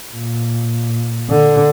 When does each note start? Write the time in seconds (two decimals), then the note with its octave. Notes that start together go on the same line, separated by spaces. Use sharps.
0.11 A#2
1.30 D3